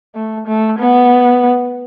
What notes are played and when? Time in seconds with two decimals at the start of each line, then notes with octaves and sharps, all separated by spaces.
0.15 A3
0.47 A3
0.79 B3